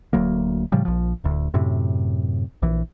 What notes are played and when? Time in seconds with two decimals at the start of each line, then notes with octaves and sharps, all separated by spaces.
0.13 D1 D2 F#3 A#3
0.72 A2 C#3 F3 G3
0.85 A#1 F3
1.24 D1 D2
1.54 F#2 A2 C3
2.62 A#1 E3